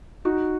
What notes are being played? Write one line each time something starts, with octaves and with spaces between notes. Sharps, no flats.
D#4 F#4